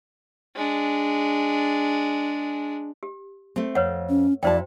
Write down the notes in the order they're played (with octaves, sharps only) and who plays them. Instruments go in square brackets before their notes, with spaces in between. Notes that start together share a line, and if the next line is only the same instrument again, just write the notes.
[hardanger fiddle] G#3 D4
[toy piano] G4
[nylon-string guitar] A3 C4
[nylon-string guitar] F2 [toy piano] B4 C#5 F#5
[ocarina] C#4
[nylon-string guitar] F2 E4 A5 [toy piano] F#4 C5 G5 [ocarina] D5